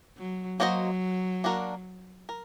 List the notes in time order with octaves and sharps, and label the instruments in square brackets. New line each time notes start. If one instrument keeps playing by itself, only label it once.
[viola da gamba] F#3
[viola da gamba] F#3 [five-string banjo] A#3 D4 F#4 C5 D#5
[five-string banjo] A#3 D4 F#4 A#4
A#4